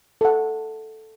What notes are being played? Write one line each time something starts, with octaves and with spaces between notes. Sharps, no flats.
A4 F#5